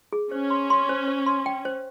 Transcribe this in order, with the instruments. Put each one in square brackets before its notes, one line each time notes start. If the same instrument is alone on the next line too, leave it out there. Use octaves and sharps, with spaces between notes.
[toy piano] G#4
[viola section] C#4 [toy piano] C5
[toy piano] C6
C6
C5
C5
C6
G5
C5